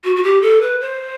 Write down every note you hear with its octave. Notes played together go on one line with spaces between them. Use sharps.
F#4
F#4
G4
A4
B4
C5